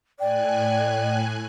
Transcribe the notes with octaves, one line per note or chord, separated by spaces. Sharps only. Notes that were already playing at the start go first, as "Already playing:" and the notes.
A2 D5 G5 G#5 F#6